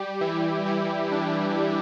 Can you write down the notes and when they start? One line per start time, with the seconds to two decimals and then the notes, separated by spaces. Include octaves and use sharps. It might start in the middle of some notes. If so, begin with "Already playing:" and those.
Already playing: G3 G4
0.21 E3 E4
0.66 E3 E4
1.12 D4